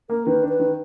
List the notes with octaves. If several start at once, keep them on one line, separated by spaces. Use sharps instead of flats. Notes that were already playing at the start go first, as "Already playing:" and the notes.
A#3 A#4
D#3 B4
D4
B4
D#3